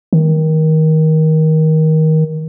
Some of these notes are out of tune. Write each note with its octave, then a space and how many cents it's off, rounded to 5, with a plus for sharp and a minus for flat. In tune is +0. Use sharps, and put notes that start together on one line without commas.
D#3 +20